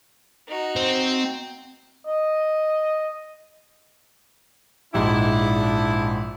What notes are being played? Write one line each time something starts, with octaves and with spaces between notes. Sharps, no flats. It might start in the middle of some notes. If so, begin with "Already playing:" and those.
D#4 F#4
C4
D#5
A#1 G#2 D4 E4